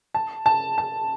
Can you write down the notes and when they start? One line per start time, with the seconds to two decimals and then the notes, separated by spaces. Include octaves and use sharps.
0.14 A5
0.46 A5
0.78 A5